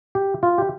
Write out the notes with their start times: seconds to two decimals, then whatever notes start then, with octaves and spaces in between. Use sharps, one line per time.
0.15 G4
0.43 F4
0.58 G4